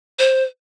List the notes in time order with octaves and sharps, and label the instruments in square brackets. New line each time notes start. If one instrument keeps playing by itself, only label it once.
[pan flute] C5